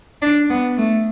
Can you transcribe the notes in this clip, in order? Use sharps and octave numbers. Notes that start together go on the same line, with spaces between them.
D4
B3
A3